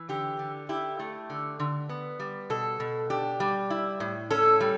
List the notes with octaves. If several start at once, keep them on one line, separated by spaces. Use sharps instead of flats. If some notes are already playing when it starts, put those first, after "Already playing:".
Already playing: E3
D3 G4
D3
E4 G4
A3
D3
D3
B3
G3
B2 A4
B2
D4 G4
G3
E4
A2
C#4 A4
G3